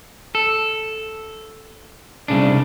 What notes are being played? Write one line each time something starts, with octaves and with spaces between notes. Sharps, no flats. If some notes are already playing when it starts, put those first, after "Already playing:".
A4
C2 C#3 D4